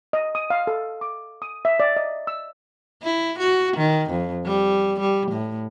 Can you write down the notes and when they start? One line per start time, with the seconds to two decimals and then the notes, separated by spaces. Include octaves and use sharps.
0.13 D#5
0.35 D#6
0.50 F5
0.67 A4
1.01 D6
1.42 D#6
1.65 E5
1.80 D5
1.97 D#5
2.27 E6
3.03 E4
3.39 F#4
3.77 D#3
4.10 F2
4.46 G3
5.00 G3
5.32 A2